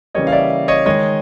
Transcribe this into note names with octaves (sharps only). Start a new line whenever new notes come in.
C#3 E3 G3 A#3 C#5 D#5
F5
D5 E5
C#5 D#5
D#3 G#3 C#5 D#5